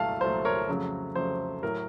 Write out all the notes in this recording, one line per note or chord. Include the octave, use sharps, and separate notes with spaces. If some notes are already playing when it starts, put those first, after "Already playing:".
Already playing: C2 A#2 F#3 A3 F5 A5
C2 A#2 F#3 A3 C5
A#4 C#5
F2 C#3 F#3 A3
F2 C#3 F#3 A3 C5
A2 F#3 A#4